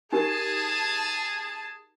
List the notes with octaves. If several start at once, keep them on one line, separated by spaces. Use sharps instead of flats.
D#4 G4 G#4 A#4 A5